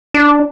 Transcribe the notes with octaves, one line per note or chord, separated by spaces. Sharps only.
D4